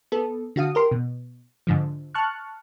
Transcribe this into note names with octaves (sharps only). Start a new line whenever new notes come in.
B3 A4
D3 F#4 F5 D#6
G4 A#4 C6
B2
G#2 D3 F3
A5 C#6 F6 F#6